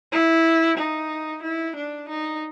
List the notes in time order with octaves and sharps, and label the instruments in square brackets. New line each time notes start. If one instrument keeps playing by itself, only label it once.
[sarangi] E4
D#4
E4
D4
D#4